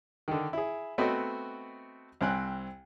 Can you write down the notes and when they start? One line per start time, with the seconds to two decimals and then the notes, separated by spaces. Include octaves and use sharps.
0.28 D3 D#3
0.53 E4 G#4
0.98 A3 B3 C4 F#4 D#5
2.21 C2 C4 G#5 F#6